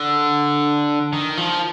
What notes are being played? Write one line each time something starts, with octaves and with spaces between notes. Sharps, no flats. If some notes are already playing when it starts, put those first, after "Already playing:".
Already playing: D3
D#3
F3